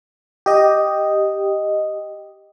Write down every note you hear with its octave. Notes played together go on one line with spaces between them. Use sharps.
G4 D#5